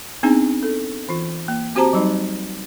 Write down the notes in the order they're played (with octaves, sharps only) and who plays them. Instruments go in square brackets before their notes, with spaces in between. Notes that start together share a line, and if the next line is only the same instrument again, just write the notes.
[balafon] B3 C4 D4 D#4 G#4
A4
E3 F4
A#3
C4 F#4 G4 C5 A5 A#5
F#3 G3 D#4